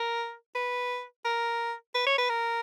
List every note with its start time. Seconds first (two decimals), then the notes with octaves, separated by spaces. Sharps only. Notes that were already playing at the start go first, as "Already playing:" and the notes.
Already playing: A#4
0.55 B4
1.25 A#4
1.95 B4
2.06 C#5
2.18 B4
2.29 A#4